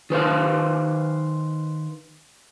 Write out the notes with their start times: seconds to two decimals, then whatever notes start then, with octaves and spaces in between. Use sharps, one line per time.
0.10 D#3 B4 C5 F5